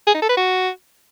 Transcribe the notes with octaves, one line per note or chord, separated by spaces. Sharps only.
G#4
D#4
A4
B4
F#4